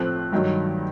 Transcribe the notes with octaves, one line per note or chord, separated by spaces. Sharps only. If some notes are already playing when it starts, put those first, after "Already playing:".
Already playing: A2 F3 A3 C4 F#6
G2 D#3 F#3